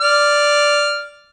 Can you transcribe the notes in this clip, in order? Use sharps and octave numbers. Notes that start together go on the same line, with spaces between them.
D5 F6